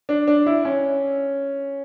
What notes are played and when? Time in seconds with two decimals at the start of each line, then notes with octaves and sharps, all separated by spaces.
0.09 D4
0.27 D4
0.46 E4
0.65 C#4